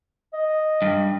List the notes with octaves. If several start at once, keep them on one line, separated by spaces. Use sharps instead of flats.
D#5
G2